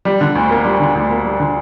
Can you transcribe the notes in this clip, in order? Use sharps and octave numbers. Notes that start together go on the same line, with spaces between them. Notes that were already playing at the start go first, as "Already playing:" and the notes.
G3
D3
D2
A#3
G3
D3
D2
A#3
G3
D3